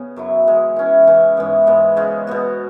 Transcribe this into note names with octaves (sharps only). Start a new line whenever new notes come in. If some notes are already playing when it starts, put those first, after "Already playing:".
Already playing: C#3 B3 C#4
F#2 F#3 E4
E3 G#3 C#4
E3 C#4 E4
C#3 E3 C#4 E4
G#2 E3 G#3 B3
G#2 G#3 B3
C#3 G#3 C#4
B2 B3 F#4